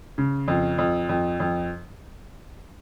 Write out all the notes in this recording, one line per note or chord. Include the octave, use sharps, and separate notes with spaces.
C#3
F2
F2
F2
F2